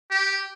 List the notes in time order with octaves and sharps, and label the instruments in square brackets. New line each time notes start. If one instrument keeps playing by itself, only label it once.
[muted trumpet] G4